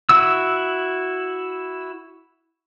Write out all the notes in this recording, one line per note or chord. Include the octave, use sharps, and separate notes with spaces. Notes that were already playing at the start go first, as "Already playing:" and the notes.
E4 F#4 E6